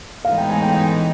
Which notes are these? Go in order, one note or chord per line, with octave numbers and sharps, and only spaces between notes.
A2 E3 G#3 B3 D#4 F5
G5
G#5
G5
G5